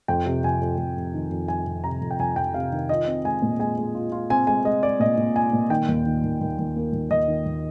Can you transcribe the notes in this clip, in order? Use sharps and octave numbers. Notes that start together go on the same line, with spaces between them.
F2 G5
C3
F2 G#5
F2
F2
F2
D#3
F2
F2 G#5
F2
C3 A#5
F2
G5
F2 G#5
F2 G5
C3 F5
D#3
F4 D#5
C4
G#3 G#5
A#2
G#3 G#5
G#3
F4
F4
C4 G#5
G#3 G#5
G#3 D#5
G#3 D5
A#2 D#5
A#2
F4 G#5
A#2
D#3 G5
D#2
D#3
D#2
D#2
D#2
A#3
D#2
D#2 D#5
D#3
D#2